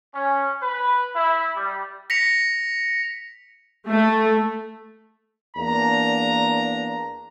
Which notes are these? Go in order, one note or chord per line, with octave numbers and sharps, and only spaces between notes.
C#4
B4
E4
G3
A#6 B6 C#7 F7
A3
E2 A#3 D4 A#5